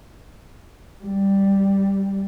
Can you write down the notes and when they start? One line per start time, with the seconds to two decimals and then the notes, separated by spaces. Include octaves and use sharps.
1.04 G3